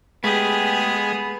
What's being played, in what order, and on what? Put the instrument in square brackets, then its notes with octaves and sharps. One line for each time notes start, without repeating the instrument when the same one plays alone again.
[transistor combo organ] G#3 [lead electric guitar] A3 G4 [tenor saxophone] B3 [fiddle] G#4